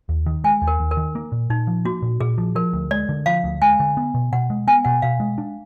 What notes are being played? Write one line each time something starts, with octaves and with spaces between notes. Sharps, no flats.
D#2
D#3
G#3 G#5
D#2
A#4
D#2
A#4
D#3
A#3
A#2
A#2 D#4
F3
A#3 F#4
A#2
A#2 G#4
F3
F3 A#4
D2
G#3 D5
D3
F3 F5
D2
G#3 G#5
D3
B3
B2
B2 F#5
G#3
B3 G#5
B2 F#5
B2 F5
G#3
D4